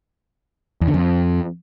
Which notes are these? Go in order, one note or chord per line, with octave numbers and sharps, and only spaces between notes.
E2
D3
F2